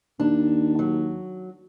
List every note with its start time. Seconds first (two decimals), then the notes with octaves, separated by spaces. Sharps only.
0.20 D#2 D4
0.79 F#3